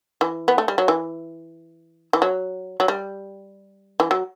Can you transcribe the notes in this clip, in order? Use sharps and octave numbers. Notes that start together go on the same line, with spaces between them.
E3
B3
A3
G3
F#3
E3
E3
F#3
F#3
G3
E3
F#3